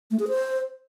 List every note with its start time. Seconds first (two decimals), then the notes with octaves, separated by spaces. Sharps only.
0.11 A3
0.19 G#4
0.28 C5